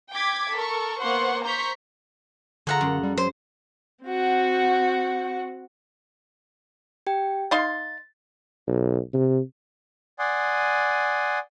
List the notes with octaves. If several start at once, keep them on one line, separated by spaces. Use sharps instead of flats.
G5 D6 G#6 B6
A4 A#4 C#6
A#3 B3 C5 F#5 C6 C#6
C5 A#5 C#6 G6 B6
D3 F4 G#4 A4 C#5 F#5 A#5
F#2 G#3
G3
F#3 C5
C4 F#4 F#5
G4 G5
D#4 F5 C6 A6
B1
C3
D5 F#5 G#5 C6 D#6